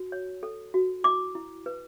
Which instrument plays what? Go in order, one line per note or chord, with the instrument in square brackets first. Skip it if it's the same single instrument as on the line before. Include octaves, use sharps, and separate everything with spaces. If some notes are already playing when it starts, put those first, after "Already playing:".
Already playing: [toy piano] F#4
C#5
A4
F#4
E4 D6
E4
B4